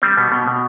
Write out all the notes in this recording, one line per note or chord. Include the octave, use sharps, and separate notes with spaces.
G3 C4
B2 B3
B2
B2